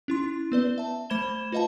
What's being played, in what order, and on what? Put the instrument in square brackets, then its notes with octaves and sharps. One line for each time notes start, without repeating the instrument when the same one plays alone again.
[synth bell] C#4 E4 C6
B3 B4 D5
E5 A5
A3 C5 B5 G#6 E7 G7
F4 B4 D#5 F5 A5